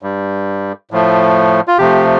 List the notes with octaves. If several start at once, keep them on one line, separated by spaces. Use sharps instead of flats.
G2 G3
A2 F3 A3
F4
C3 F3 A3 G4